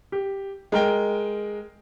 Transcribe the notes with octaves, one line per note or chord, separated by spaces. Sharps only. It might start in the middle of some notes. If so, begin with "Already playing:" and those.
G4
G#3 A#4 G5